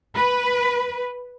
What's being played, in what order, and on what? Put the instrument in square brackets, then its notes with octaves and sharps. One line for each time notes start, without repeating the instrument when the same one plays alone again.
[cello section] B4